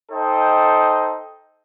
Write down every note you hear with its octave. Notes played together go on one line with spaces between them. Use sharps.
D#4 A4 C5 D#5 G5